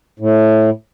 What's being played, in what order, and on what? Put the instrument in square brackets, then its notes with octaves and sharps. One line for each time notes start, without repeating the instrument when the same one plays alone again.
[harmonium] A2